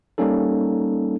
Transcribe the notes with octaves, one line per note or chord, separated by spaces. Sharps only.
G3 A#3 C#4 D#4 A4